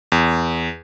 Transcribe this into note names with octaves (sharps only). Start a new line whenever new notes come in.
E2